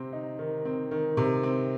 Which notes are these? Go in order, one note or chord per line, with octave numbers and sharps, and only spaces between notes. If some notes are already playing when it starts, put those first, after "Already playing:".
Already playing: C3 C4
D#4
D#3
C4
D#3
C3
C4